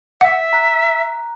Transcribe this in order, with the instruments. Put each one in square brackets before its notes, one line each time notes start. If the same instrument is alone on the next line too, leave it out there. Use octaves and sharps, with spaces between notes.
[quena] E5 [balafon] F#5
[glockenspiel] A#5 F#6